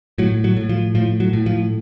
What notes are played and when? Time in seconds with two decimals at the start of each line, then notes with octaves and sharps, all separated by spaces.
0.18 A2 F#3
0.44 F#3
0.57 A2
0.69 F3
0.95 A2 F3
1.20 F#3
1.33 A2
1.46 F3